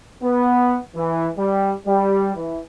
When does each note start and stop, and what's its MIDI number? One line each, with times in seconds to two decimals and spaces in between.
0.23 0.77 59
0.95 1.28 52
1.38 1.72 55
1.87 2.31 55
2.36 2.59 52